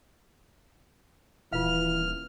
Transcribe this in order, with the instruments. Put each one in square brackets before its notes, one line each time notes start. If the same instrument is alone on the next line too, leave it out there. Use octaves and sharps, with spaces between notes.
[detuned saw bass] D#1 [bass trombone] E3 [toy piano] F4 F5 [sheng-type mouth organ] F6